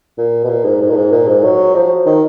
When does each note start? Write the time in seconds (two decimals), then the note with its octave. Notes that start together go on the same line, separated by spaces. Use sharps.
0.18 A#2
0.44 B2
0.49 A#2
0.65 G#2
0.81 G#2
0.90 A#2
0.96 G#2
1.12 A#2
1.28 G#2
1.44 F#3
1.75 F3
2.06 D#3